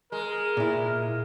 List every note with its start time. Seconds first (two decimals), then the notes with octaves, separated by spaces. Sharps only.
0.12 G#3 A#4
0.57 A#2 E4